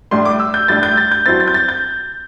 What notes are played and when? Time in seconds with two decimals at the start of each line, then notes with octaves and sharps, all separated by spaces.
0.11 A2 G3 D4 C6
0.25 D6
0.40 E6
0.54 G6
0.68 A2 G3 D4 A6
0.83 G6
0.97 A6
1.12 G6
1.26 G2 F#3 C4 E4 A6
1.40 A6
1.48 G6
1.54 A6
1.69 G6